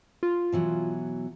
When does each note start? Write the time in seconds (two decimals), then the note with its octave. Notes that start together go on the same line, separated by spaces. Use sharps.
0.23 F4
0.52 B2 E3 F#3